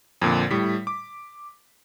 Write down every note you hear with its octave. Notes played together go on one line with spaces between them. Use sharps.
F2 A#2 D3
A2 G3 B6
D6